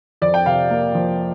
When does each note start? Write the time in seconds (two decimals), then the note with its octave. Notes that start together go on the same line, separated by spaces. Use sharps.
0.22 F2 D5
0.34 G5
0.46 C3 F5
0.70 A#3
0.94 F3